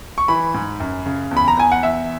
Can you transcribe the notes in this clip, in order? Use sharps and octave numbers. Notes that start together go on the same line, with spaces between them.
C#6
E3 B5
G#2
F#2
C#3
E2
B5
A#5
E2 G#5
F#5
E2 E5